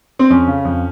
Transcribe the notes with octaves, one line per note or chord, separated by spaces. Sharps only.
C4
F2 C#4
C#3
F2